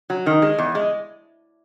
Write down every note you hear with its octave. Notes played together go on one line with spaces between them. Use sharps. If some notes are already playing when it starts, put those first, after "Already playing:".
F#3
D#3
G#3
E2
G#3